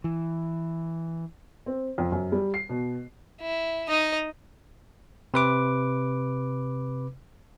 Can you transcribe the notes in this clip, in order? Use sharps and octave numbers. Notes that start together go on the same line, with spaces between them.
E3
C4
F2
F#2
G3
C7
B2
E4
D#4 D#5
C3 B4 D6